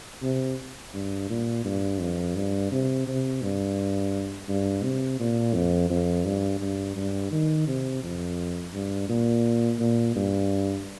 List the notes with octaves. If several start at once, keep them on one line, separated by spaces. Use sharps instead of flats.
C3
G2
A#2
G2
F2
G2
C3
C3
G2
G2
C3
A#2
F2
F2
G2
G2
G2
D#3
C3
F2
G2
A#2
A#2
G2